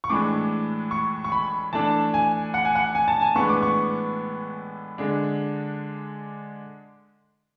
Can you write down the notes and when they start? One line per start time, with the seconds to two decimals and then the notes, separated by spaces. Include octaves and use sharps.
0.04 C#6
0.10 A2 E3 G#3 D4 D6
0.91 C#6
1.24 C#6
1.32 B5
1.73 E3 A3 D4 A5
2.14 G#5
2.54 F#5
2.65 G#5
2.75 F#5
2.95 G#5
3.08 A5
3.21 G#5
3.35 A2 E3 G#3 B3 D4 C#6
3.49 D6
3.62 C#6
4.98 D3 G#3 D4